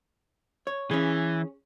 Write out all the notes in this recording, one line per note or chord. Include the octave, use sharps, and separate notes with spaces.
C#5
E3 C#4 G#4